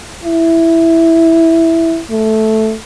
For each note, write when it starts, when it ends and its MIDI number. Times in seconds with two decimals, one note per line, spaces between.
0.23 2.00 64
2.10 2.74 57